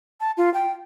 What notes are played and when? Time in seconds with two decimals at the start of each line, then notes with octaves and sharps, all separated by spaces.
0.20 A5
0.37 F4
0.54 G5